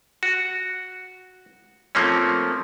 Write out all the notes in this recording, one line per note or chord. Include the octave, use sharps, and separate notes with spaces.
F#4
F3 A3 A#3 C4 C#4